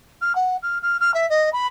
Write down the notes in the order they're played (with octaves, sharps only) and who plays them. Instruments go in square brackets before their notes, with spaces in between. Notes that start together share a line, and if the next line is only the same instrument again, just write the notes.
[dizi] F6
F#5
F6
F6
F6
E5
D#5
B5